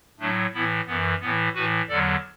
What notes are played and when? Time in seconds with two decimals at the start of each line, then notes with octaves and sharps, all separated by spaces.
0.19 A2 F#3 A3 D4
0.54 A2 E3 B3 E4
0.87 F#2 E3 B3
1.21 A2 E3 B3
1.54 A2 E3 F#4 B4
1.89 E2 D3 F#3 A4 D5